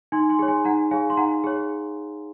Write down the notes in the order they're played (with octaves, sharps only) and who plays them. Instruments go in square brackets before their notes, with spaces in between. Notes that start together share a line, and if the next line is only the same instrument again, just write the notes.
[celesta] D#4 G#5 C6
G#5 C6
G#4 C#5
G#5 C6
D#4 F#5 A#5
G#4 C#5 F5 G#5
C6
D#4 F#5 A#5
G#4 C#5